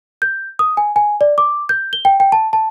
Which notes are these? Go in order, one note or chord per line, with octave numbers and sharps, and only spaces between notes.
G6
D#6
G#5
G#5
D5
D6
G6
G7
G5
G5
A5
A5